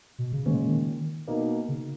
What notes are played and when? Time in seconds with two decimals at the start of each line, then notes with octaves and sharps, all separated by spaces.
0.19 B2
0.33 C#3
0.46 A#2 D#3 G#3 C#4
0.66 D#3
1.28 B2 A#3 D#4
1.68 C#3